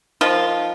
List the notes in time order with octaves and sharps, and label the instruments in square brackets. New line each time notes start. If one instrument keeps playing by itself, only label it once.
[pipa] D#3 F3 F4